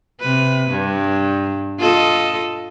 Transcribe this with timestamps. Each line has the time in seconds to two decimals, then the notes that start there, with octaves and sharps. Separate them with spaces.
0.20 C3 B4
0.71 G2
1.79 F4 A4 D#5